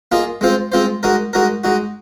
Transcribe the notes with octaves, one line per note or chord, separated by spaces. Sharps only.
A#3 F4 G#4 D#5
G#3 C4 F4 C5
G#3 C4 F4 C5
G#3 D#4 F#4 A#4
G#3 D#4 F#4 A#4
G#3 D#4 F#4